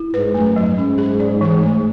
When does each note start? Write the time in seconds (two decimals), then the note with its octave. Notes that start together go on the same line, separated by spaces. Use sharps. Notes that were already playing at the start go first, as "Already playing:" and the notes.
Already playing: E4
0.14 G#2 B4
0.34 F#2 A3
0.56 G#2 F#3
0.78 C#4
0.98 G#4
1.20 D5
1.41 E3
1.62 A3